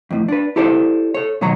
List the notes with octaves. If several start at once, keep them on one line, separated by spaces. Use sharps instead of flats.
F2 A2
D4 B4
E4 G4 A4 C5 D5
A4 C#5
B2 D#3 F#3 C#5 A#5